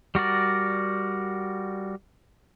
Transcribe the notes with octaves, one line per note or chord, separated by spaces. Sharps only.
G3 F#4 A#4 D5